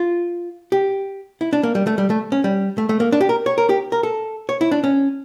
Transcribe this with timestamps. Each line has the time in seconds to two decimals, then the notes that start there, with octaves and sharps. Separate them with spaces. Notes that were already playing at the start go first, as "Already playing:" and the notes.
Already playing: F4
0.72 G4
1.41 E4
1.53 D4
1.63 A#3
1.75 G3
1.87 A3
1.98 G3
2.10 A3
2.32 C#4
2.44 G3
2.78 A3
2.89 A3
3.00 A#3
3.12 D4
3.21 G4
3.29 A#4
3.46 C#5
3.58 A#4
3.69 G4
3.92 A#4
4.03 A4
4.49 C#5
4.61 E4
4.71 D4
4.84 C#4